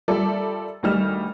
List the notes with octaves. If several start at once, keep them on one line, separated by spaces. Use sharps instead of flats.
G3 F4 A4 A#4 D5 E5
D2 D#3 G3 D#5 F6 E7